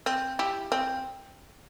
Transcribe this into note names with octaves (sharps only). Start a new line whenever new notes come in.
C4
E4 G4
C4